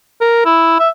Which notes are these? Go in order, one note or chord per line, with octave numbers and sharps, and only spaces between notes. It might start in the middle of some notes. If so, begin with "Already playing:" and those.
A#4
E4
E5